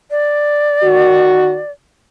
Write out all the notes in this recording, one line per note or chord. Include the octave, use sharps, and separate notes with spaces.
D5
D#3 F#4